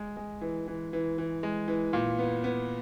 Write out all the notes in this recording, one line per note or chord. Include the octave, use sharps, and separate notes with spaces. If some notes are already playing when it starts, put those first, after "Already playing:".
Already playing: G#3
G#3
E3
E3
E3
E3
G#3
E3
A#2
B3
B3